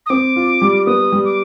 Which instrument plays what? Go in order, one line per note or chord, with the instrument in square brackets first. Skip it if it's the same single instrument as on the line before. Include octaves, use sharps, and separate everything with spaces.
[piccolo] D#6
[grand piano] C4 [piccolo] D6
[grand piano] F4
G3
[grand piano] B3 [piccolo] D#6
[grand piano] G3
[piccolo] D6